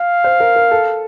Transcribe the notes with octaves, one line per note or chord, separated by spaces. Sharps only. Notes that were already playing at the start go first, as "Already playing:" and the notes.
Already playing: F5
C5
A#4
A#4
A4